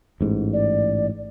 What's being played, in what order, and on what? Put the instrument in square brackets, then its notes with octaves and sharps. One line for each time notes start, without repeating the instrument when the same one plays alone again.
[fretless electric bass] A1 G#2
[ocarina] D5